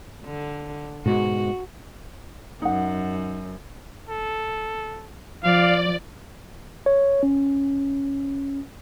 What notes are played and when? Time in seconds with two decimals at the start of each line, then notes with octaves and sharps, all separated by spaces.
0.25 D3
1.06 G#2 B2 G#3 F#4
2.62 F#2 D#4 F#5
4.09 A4
5.44 F3 D5 F5
6.86 C#5
7.23 C#4